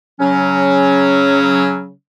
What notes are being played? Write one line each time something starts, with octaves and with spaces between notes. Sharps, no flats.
C#3 F#3 C#4